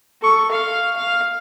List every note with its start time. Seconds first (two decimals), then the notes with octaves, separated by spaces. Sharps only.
0.21 A4 C#6
0.51 F5
0.96 F5